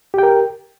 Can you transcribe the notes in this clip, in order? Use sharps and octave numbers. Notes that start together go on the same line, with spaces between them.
G4 A#4 G5